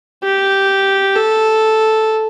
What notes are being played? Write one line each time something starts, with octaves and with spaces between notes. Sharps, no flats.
G4
A4